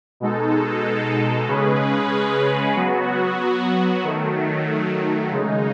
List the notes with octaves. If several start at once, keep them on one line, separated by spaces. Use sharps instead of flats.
B2 G#3 D#4 A4
C#3 G#3 C#4 G#4 B4
F#3 B3 F#4
D#3 F#3 A3
C#3 G#3 D#4